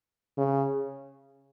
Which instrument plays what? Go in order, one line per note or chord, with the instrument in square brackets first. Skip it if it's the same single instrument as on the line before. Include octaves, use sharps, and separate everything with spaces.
[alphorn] C#3